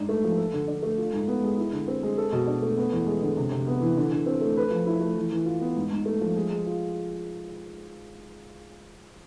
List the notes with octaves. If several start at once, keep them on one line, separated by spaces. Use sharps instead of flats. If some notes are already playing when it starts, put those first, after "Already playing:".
Already playing: G#2 D4
A3
F3
A4
D3
D4
A3
F4
G#2
B3
G#3
E4
D3
C4
G#3
A4
B2
D4
A3
B3
E2
G#3
D3
C3
C3
B3
E3
D3
D3
C4
A3
B4
F3
E4
A3
E3
E3
F4
B3
G#2
G#2
A3
F3
G#3
G#3
F4